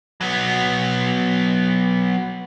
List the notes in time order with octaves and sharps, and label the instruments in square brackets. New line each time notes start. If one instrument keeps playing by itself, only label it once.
[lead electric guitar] F#3 B3